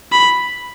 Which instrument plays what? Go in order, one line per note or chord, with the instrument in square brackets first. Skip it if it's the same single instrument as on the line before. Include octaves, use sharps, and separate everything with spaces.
[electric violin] B5